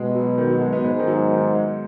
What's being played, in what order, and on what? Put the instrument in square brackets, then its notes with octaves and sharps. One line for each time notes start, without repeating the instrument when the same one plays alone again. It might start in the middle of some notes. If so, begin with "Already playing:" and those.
Already playing: [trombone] B2 [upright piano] G#3
[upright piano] F#3
D#3
F#3
G#3
B3
[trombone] G#2 [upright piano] G#3
[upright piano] D#3
F#3
D#3
G#3